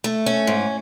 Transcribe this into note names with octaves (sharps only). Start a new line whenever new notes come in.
A3
C#4
G#2